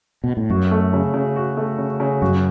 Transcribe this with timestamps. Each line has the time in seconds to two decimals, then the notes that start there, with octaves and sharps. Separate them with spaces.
0.24 B2
0.37 A2
0.50 F#2 F#4
0.71 A3
0.93 C#3
1.14 C#3
1.36 F#4
1.57 A3
1.78 C#3
2.00 C#3
2.21 F#2 F#4